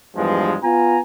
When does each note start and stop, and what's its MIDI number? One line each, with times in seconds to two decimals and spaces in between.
0.16 0.57 40
0.16 0.57 43
0.16 0.57 53
0.16 0.57 56
0.63 1.00 59
0.63 1.00 65
0.63 1.00 80
0.63 1.00 82